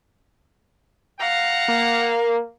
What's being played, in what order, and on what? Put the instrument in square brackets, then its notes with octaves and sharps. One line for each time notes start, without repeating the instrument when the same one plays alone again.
[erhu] F5 [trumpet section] F#5 A#5
[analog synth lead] A#3